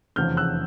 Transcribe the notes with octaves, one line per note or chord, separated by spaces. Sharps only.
F1 E2 C#3 F3 F6 G6
E6 F#6